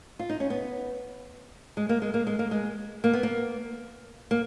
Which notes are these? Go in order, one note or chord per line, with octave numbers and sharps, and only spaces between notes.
F4
D#4
C#4
B3
G#3
A#3
G#3
A#3
G#3
A#3
G#3
A#3
B3
A#3
A#3